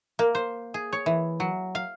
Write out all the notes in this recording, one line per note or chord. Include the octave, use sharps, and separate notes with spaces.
A#3
C5
G#4
C#5
E3
F#3
F5